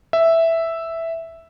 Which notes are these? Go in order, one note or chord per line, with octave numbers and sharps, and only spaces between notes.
E5